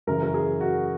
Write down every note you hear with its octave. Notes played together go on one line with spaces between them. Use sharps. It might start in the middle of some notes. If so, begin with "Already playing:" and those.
F#2 C#3 E3 A#4
A#4
G#4
F#4